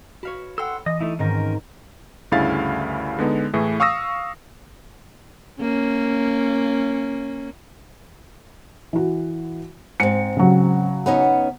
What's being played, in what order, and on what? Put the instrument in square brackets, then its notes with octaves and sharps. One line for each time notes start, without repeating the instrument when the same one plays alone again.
[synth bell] F#4 [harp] C#5 F5 B5
[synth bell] A4 G5 [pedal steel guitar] F#5 C6 E6
[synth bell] E3 [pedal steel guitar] D#5
[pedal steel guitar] A3 D#4 E4
[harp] G#2 D#3 C4 [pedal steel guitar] C#4 A#4
[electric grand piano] D2 G2 C#3 E4 F5 A6
D3 G#3 B3 D#4
A2 E3 A3 G#4
F5 C#6 D#6 E6 A#6
[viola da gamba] A#3 C#4
[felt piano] E3 F#4
[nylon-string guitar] G#2 C4 [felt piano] C#7
[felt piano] C#3 F#3
[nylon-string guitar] B3 C#4 D#4